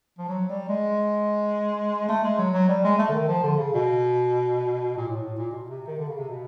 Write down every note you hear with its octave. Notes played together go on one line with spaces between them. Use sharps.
F3
F#3
G3
G#3
A3
G#3
F#3
F#3
G3
G#3
A3
D3
D#3
F3
D3
C#3
B2
A#2
A2
A2
A#2
B2
C3
D#3
D3
C#3
C3
B2